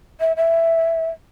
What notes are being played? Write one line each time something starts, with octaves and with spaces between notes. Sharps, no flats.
E5
E5